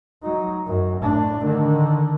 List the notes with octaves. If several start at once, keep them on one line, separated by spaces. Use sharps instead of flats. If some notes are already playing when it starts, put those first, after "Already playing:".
F#3 D#4
F#2
A2 D4
D3 D#3